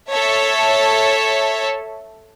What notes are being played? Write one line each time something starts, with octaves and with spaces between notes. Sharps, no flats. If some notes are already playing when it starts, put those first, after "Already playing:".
A4 C#5 E5 A5